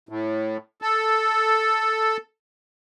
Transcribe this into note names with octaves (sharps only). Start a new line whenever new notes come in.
A2
A4